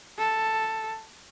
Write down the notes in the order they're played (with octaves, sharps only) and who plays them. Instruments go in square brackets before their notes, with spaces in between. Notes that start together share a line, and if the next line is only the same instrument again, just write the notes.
[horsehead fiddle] A4